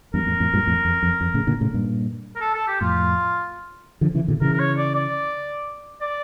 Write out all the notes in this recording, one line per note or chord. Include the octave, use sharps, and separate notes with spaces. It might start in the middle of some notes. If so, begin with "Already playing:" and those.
E2 G2 A#4
F2 A2
F2 A2
G2 A#2
F2 A2
F2
F2
F2
A2 C#3
A#2 D3
A2 C#3
G2 A#2
A#4
A4
A4
G4
F2 A2 F4
D3 F3
C#3 E3
A#2 D3
C#3 E3 A#4
A#4
C#5
D5
D5
D5